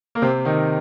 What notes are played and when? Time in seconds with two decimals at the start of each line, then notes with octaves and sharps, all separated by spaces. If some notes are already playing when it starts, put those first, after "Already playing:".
0.15 A#3
0.22 C3 C4
0.45 D#3 D#4